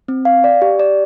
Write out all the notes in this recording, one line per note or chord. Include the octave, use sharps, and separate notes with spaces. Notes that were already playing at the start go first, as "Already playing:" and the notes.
C4
F5
D5
G4
D5